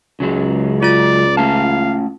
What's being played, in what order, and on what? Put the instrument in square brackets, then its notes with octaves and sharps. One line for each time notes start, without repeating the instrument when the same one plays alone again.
[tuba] C#2 [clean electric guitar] C#3 F#3 G#3
[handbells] F4 A6 [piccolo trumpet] D5
[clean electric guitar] A3 C#4 A5 [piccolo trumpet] F5